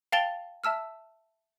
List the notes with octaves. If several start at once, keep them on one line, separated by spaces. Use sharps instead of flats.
F5 G5 A5 A6 F7 G7
E5 A5 E6 F6